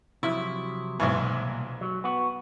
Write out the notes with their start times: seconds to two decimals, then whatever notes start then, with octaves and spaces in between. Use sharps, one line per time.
0.23 C3 F3 F#3 E4
1.00 B1 G#2 B2 E3
1.13 C2 A#2
1.81 F#3
2.04 B3 F#4